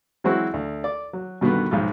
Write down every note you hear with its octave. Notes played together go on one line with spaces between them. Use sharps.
E3 F#3 G#3 C4 E4 F#4
D2
D5
F#3
G2 B2 D3 D#3 B3
B1 G#2 F3 F4